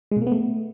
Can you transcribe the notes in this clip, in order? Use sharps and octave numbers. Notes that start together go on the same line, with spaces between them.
G#3
B2
A#3
B3
A3